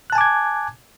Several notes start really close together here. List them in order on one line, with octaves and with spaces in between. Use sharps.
F#6 A5 G#5 D6 G#6